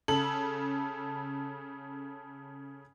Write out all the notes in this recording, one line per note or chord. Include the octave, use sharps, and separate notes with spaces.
C#3 A4 F#7